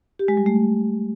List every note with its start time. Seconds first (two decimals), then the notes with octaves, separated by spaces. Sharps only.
0.19 G4
0.28 G#3
0.37 G3
0.46 A3